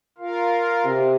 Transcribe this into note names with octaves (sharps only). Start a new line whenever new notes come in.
F4 A#4 F5
C3